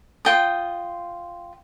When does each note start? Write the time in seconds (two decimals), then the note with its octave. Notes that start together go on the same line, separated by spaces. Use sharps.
0.25 F4 G5 D#6